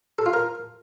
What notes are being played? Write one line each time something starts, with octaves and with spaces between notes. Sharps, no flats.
A4
F4
A#4